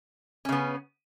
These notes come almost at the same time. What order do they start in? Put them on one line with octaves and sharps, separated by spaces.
C#4 C#3 B3